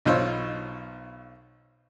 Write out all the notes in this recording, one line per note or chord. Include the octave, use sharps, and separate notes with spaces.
B1 B2 F4 C5 C#5 E6